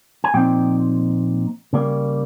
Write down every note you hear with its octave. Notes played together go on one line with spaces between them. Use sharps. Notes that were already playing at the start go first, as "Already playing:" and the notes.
G#5
A#2 F3 C4 D#4 G5
C#3 G3 A#3